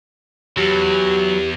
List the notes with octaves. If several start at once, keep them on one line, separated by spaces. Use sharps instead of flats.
E2 F#3 G4